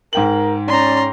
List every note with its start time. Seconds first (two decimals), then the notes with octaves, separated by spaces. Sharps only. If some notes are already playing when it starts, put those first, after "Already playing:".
0.13 G#2 A#4 G5 F#7
0.68 C#4 D5 A#5 C6